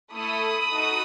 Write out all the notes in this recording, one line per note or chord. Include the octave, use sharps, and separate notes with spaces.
A3 E4 A4 B5 D#6
D#4 F#4 A4